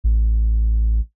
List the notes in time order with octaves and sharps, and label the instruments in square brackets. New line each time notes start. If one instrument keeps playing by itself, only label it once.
[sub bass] A1